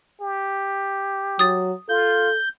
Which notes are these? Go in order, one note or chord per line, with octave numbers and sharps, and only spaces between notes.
G4
F#3 D#6 A6
F4 A4 G6